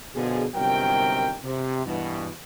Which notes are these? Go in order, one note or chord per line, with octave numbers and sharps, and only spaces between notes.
B2 D3 F3 G#4
G1 C3 D#3 F#3 A#4 G5
C3
G2 B2 E3